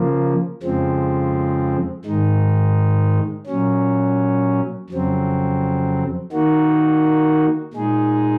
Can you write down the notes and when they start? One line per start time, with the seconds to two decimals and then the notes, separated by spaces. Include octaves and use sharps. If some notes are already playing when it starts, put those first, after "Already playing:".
Already playing: C#3 F3 A#3
0.62 F2 C#3 F3 G#3 C4
2.05 G#2 D#3 G#3 D#4
3.47 A#2 F#3 C#4
4.89 F2 C#3 F#3 C4
6.32 D#3 A#3 D#4 F#4
7.73 A#2 G#3 D#4 G#4